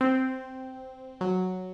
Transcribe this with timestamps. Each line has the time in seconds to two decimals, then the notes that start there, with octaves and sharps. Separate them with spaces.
0.01 C4
1.21 F#3